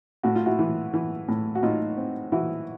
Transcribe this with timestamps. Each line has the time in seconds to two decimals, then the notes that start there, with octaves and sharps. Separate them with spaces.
0.23 A2 F#4
0.36 F4
0.46 E4 F#4
0.59 E3
0.94 E3
1.28 A2
1.55 F#4
1.63 A2 D#4 F4
1.97 C4
2.32 E3 E4 F#4